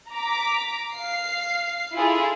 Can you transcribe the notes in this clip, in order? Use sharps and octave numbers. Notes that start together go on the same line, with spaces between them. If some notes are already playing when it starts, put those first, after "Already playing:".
A#5 D6 B6
F5 C7
E4 F4 G#4 A4